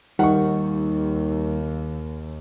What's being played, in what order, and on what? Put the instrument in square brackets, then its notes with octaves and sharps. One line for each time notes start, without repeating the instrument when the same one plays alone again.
[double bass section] D#2 [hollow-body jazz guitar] D#3 [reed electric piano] G3 D#4 C#6 [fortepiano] F#5